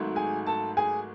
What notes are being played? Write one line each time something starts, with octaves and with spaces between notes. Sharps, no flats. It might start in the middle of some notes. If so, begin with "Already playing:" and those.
Already playing: G#1 G#2 F#3 A3
G#4 G#5
A4 A5
G#4 G#5